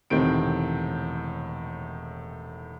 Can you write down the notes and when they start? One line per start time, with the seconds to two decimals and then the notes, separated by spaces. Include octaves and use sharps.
0.10 E1 A2 C3 D#3 C4 D7